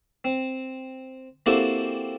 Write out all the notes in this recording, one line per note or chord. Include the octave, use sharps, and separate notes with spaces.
C4
A#3 C4 E4 F#4 G4 A4